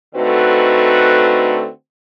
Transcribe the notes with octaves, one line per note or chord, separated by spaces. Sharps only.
D3 A3 C4 D#4 F#4 B4